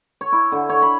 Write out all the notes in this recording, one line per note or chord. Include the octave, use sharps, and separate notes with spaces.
C#5
E4
D3
C#5
B5